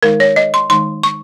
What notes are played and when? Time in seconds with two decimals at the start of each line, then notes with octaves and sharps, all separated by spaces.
0.03 D#3 G#3 D#4 A#4
0.20 C#5
0.36 D#5
0.54 C6
0.70 D#3 G#3 D#4 C6
1.03 C#6